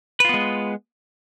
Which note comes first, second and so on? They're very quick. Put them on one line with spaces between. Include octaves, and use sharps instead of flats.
B4 F4 B3 G#3